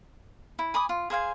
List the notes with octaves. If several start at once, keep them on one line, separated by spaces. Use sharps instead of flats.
E4
G#5 B5 D6 D#6
F4
G#4 C5 F5 G#5